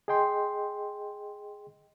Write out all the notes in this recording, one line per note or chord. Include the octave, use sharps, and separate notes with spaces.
G#4 D#5 G5 C6